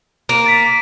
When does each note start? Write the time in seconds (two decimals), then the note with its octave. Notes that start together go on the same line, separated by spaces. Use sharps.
0.29 A#3
0.46 A6 B6